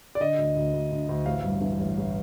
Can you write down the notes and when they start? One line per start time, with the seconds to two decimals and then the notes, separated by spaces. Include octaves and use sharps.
0.15 D5
0.20 D3 D#5
0.38 D2
0.56 D2
0.73 D2
0.92 D3
1.09 D2
1.26 A1 F5
1.45 G2
1.61 E3
1.79 A1
1.97 A1